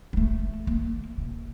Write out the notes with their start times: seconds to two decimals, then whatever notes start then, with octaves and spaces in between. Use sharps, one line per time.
0.13 F#3
0.17 A3
0.67 A#3
1.18 C3